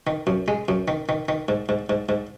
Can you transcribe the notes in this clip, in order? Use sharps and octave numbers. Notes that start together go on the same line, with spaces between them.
D#3
F#2
G#3
F#2
D#3
D#3
D#3
G#2
G#2
G#2
G#2